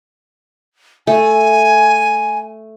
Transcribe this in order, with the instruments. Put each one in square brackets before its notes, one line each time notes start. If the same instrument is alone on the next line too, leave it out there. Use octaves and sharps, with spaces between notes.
[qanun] A3 [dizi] G#5